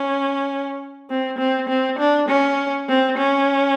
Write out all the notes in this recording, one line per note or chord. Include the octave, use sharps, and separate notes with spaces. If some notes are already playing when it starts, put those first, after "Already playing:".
Already playing: C#4
C4
C4
C4
D4
C#4
C4
C#4